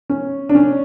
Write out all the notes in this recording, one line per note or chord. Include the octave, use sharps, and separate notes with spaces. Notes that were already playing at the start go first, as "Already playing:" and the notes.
C#4
D4
C#4